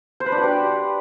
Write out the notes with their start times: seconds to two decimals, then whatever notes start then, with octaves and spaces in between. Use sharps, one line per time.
0.20 C5
0.26 B4
0.32 D4
0.38 F#4
0.43 G4